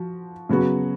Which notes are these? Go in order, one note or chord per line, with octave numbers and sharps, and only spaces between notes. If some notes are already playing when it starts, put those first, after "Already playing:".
Already playing: F3 F#4
C#3 F#3 B3 F#4